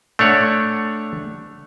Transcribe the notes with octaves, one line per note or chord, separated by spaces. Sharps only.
A3 D4 C#5 F#5